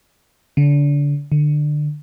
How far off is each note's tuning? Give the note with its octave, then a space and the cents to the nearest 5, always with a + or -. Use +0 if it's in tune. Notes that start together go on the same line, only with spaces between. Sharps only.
D3 -30
D3 +20